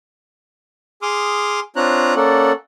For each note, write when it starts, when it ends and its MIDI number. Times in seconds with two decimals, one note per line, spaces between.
1.02 1.60 68
1.02 1.60 84
1.02 1.60 86
1.02 1.60 87
1.02 1.60 89
1.76 2.14 60
1.76 2.14 62
1.76 2.14 65
1.76 2.14 73
1.76 2.14 82
1.76 2.14 90
2.16 2.52 58
2.16 2.52 61
2.16 2.52 69
2.16 2.52 74
2.16 2.52 78